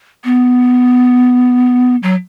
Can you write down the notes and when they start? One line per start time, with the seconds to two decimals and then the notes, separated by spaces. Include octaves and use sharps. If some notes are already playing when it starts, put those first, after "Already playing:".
0.25 B3
2.03 F#3